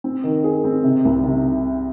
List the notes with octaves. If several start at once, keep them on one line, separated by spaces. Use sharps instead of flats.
C4
D#3
G#4
C4
C3
C2
C3